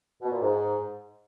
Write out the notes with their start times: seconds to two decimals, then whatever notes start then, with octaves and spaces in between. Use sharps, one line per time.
0.22 B2
0.31 A#2
0.41 G#2